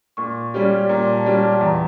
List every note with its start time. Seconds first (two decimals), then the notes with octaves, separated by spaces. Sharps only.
0.17 A#2 C#6
0.54 G3 C#4 G4
0.89 A#2 A#5
1.13 A5
1.26 G3 C#4 G4
1.38 A5
1.50 A5
1.61 E2 A#5